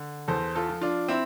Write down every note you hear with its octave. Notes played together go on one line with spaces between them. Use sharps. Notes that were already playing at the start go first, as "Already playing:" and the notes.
Already playing: D3
E2 A4 C5
F4 A4
F3
D4 F4
C4 E4